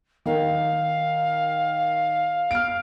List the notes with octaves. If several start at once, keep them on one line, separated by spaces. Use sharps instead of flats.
D#3 A#4 F5
F6 D7